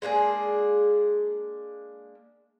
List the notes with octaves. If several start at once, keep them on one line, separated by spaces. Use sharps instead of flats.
G#3 A#3 D4 G#4